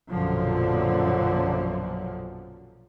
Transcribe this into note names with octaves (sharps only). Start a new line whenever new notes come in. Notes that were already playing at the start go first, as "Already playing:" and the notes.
A#1 F#2 B2 D3 F3 F#3